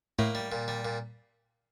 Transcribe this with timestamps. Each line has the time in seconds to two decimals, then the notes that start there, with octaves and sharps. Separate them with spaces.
0.19 A2 A3 A#3
0.35 G3
0.52 A#2
0.68 G3
0.85 A#2